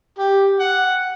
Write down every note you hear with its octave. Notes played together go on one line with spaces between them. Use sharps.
G4
F#5